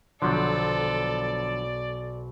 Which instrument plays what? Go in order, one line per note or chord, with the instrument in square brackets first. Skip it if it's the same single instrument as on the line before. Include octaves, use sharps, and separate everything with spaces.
[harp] B1 C5 [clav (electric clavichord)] D3 F3 F#3 [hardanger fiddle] A4 [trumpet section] D5